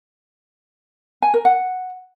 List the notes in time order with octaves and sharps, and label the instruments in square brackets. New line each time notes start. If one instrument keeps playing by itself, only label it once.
[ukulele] G#5
A#4
F#5